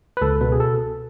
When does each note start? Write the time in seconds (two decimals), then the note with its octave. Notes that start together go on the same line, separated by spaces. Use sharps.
0.17 B4
0.22 C#2 A4
0.41 B2 B4
0.52 G#4
0.60 A4